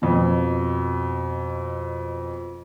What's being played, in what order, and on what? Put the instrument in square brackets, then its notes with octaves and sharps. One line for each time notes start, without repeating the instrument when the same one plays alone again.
[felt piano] F2 B2